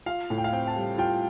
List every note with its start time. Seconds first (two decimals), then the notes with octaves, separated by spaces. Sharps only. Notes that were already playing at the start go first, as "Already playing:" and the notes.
0.06 F4 F5
0.30 A2
0.38 G5
0.44 F5
0.52 C4 G5
0.68 A5
0.76 G3
0.98 F4 G5